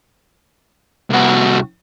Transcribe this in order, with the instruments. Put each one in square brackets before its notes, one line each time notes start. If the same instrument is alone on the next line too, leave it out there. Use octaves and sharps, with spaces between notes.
[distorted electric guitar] C2 F#4